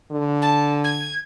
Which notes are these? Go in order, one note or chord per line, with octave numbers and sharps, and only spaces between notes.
D3
A5
G#6